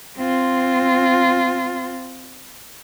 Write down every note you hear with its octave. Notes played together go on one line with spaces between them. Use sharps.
C4 F4